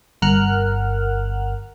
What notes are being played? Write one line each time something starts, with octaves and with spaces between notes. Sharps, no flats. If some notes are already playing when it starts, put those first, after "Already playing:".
G1 A#4 F#5 F6 F#6